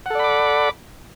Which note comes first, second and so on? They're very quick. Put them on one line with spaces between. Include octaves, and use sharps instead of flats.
F#5 A4 D5 B5 D6